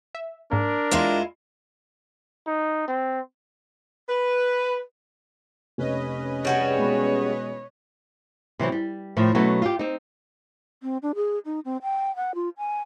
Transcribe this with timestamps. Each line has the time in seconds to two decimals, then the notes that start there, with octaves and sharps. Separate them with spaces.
0.15 E5
0.51 G#2 A#3 D4 A#4
0.91 E2 G#3 E4 F4 C6 E7
2.47 D#4
2.88 C4
4.08 B4
5.78 F1 C#4 B4 D#5
6.45 G3 F#4 G#4 C#5
6.78 B2 G#3 B5
8.59 C3 E3 F#3 C4
8.72 G3
9.17 A2 D#3 F3
9.35 B2 F#3 A3 B3 C#4
9.62 F4 G4
9.79 C4 D#4
10.83 C4
11.02 D4
11.15 G#4
11.45 D#4
11.65 C4
11.83 G5
12.16 F#5
12.35 F4
12.58 G#5